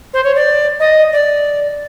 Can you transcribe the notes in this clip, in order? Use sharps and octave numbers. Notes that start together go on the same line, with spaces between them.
C5
C#5
D5
D#5
D5